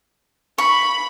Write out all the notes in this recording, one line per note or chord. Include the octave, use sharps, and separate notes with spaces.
B5 C#6